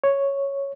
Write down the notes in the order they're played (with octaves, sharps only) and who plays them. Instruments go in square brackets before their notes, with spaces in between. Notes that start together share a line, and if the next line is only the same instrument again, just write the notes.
[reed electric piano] C#5